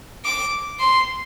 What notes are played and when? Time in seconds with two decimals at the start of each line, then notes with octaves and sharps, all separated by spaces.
0.25 D6
0.79 C6